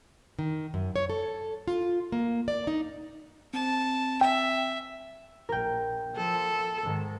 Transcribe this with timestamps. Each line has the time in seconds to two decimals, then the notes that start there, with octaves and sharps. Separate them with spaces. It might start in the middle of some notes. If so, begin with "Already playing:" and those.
0.39 D#3
0.74 F#2
0.96 C#5
1.10 A4
1.68 F4
2.12 A#3
2.48 D5
2.67 D#4
3.54 C4 A5
4.21 E5 G5
5.49 A#1 A#4 G5
6.16 F3 A4
6.83 G#2 D#3